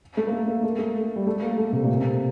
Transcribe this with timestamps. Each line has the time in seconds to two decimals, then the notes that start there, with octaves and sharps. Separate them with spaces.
0.17 A3
0.27 A#3
0.32 A3
0.48 A#3
0.64 A3
0.79 A3
1.16 G3
1.27 A3
1.42 A#3
1.58 A3
1.73 C3
1.84 A#2
1.94 C3